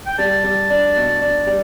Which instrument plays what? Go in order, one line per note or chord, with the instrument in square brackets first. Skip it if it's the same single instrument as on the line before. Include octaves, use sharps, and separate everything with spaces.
[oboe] G5
[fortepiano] G3 [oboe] A5
[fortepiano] G3
D4
B2
D4
G3